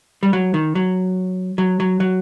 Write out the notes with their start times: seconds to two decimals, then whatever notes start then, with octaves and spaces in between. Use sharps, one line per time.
0.23 G3
0.33 F#3
0.54 D#3
0.75 F#3
1.58 F#3
1.80 F#3
2.00 F#3